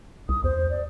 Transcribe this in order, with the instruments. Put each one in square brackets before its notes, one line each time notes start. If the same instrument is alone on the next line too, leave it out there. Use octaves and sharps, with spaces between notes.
[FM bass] C2 [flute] D#6
[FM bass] E2 [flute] C5
[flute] D5